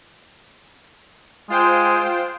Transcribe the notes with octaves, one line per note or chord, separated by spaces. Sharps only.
G#3 F4 C5 G5